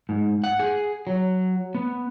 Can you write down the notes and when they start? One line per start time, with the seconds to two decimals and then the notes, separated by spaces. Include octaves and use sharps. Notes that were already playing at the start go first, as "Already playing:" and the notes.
0.09 G#2
0.44 F#5
0.59 G#4
1.07 F#3
1.75 B3